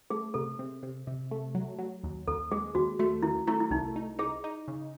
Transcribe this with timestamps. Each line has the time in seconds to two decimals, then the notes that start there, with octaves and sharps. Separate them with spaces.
0.10 A3 G#4
0.34 C3 A4
0.59 C3
0.83 C3
1.07 C3
1.31 A3
1.55 F#3
1.78 F#3
2.03 D#2
2.28 D#2 A4
2.51 G#3 G#4
2.75 D#2 F#4
2.99 A3 F#4
3.23 D#3 E4
3.47 A3 E4
3.60 E4
3.71 C2 D#4
3.96 D#4
4.19 D#4 G#4
4.44 D#4
4.68 C#3